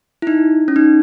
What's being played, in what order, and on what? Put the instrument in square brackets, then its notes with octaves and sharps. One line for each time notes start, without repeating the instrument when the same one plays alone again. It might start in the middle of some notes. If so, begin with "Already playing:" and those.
[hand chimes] E4
D#4
C#4
D#4